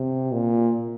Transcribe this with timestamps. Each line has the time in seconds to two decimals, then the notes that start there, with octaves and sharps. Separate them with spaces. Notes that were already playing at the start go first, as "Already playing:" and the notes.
Already playing: C3
0.32 A#2